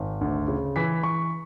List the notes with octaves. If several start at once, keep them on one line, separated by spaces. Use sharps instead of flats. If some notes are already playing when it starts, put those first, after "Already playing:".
Already playing: G#1
D2
C#3
E3 B6
E3 C#6